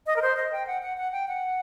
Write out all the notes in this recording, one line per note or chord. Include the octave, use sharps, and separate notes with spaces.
D#5
A#4
C5
D#5
G5
F#5
F#5
F#5
G5
F#5